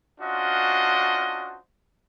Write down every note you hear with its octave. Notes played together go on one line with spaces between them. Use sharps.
C#4 D4 F4 F#4 C5 D#5